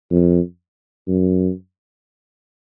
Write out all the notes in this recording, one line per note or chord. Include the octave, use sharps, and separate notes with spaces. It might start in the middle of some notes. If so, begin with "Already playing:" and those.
F2
F#2